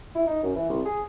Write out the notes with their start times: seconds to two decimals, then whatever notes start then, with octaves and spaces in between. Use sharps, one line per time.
0.15 E4
0.27 D#4
0.43 F#2
0.56 E3
0.70 C2
0.86 G#4